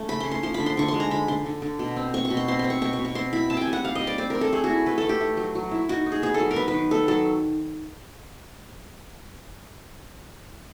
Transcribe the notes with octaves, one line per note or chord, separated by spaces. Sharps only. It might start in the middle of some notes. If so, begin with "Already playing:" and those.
Already playing: A3 C#4
C#3 B5
C6
C#4
C6
F3 C6
B5
D3
C6
D3 C#6
C6
G#3
A#5
D3 B5
D3 C6
D3
D3
B2
C4
C4 C#6
C#6
B2
C6
C4 C6
C4 C6
C#6
B2 C#6
C#6
B2
C#6
C4 C6
E4 B5
C4 A5
G5 G#5
G3
F#5
G3 F5
D#5
G3
D5
C4 D5
C4 A#4
A4
A3 G#4
F#4
E4
A3 B4
A4
A3
G4
A3
F#3
F#3
E4
D#4 F#4
D#4
G#4
B3 G#4
A4
F#3
A#4
B3 B4
B4
D#3
B3 A4
F#3 A4